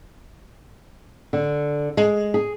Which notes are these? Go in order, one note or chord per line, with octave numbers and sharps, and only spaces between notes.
D3
G#3
G#4